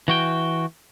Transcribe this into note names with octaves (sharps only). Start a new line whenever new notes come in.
E3 F#4 G5